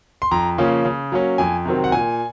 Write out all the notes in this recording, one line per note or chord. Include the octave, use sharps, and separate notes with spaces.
C6
F2 A#5
C#3 F3 A#3 C#4
C#3
F#3 A#3 C#4
F2 G#5
C3 D#3 F#3 C4
F#5
A#2 G#5